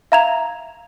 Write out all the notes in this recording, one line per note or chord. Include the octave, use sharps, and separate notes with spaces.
E5 F5 A#5 G#6 F7